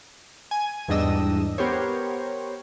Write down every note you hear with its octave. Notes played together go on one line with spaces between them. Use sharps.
G#5
E2 G#2 G3 D4 D#5 E6
B3 G4 A#4 C5 C#5